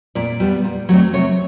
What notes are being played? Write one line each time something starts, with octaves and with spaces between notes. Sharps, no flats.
A#2 D5
G3 B3
A#2
F#3 A3 C4
C3 C#5